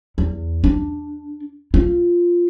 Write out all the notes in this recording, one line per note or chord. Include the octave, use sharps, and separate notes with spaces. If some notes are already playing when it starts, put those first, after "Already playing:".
E2
D4
F4